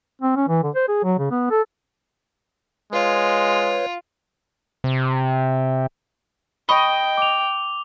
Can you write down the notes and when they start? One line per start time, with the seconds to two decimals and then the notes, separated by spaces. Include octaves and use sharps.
0.22 C4
0.36 C#4
0.48 E3
0.63 D3
0.75 C5
0.88 G#4
1.04 F#3
1.19 C#3
1.31 B3
1.51 A4
2.93 G#3 F4 B4 C#5
4.84 C3
6.69 D#5 G5 B5 C#6 G7
7.17 D6 F7